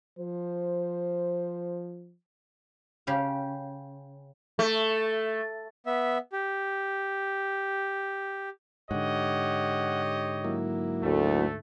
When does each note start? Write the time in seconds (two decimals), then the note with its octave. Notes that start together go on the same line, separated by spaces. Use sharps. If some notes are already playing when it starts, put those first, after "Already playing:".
0.19 F3 C5
3.07 C#3 G4 F5
4.59 A3
5.86 B3 E5
6.32 G4
8.91 G#2 D3 G4 C#5 D#5 F#5
10.44 F#3 A#3 E4
11.03 D2 A3